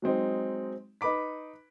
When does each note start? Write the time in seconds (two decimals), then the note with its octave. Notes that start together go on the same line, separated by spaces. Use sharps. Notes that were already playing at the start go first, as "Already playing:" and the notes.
0.02 F#3 G#3 C4 D#4
1.01 D#4 B4 B5 D6 B6